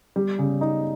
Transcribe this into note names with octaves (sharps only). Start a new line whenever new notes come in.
G3
C#3
D#4